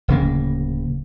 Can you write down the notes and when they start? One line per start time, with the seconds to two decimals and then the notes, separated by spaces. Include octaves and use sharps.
0.08 D1 C#3 A#3